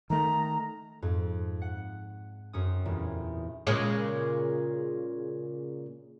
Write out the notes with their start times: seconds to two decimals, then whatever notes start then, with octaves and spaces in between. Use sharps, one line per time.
0.10 D#3 A3 A#5
1.02 F2 G#2
1.62 F#5
2.53 F#2 C4 C#4 D#6
2.85 A1 E2 A#2 G3
3.67 A#2 C#3 G#3